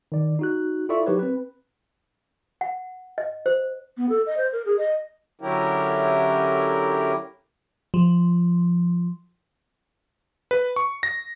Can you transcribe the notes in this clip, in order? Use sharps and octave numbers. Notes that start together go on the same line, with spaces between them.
D#3 D5
D#4 F#4 F#6
E4 F4 A4 D5 E5 C#6
F#3 D#4 G4 A#4 B4 C#5
C4 B4
F#5
D#5
C5
B3
A4
D#5
C5
A#4
G#4
D#5
D3 F#3 C#4 E4 G4 A#4
F3
B4
C#6
A#6